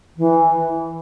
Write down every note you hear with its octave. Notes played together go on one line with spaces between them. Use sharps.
E3